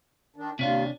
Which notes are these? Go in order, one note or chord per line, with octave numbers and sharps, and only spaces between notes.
D#3 D4
D#2 C3 C#4 D4 F4